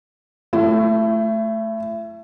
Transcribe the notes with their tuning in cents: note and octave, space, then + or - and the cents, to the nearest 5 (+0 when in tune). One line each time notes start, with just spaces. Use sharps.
A3 +0 E4 +30